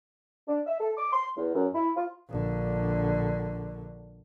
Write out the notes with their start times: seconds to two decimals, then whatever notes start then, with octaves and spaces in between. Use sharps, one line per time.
0.47 D4
0.66 E5
0.80 A4
0.96 D6
1.12 C6
1.35 E2
1.54 F#2
1.73 E4
1.95 F4
2.29 A#1 D3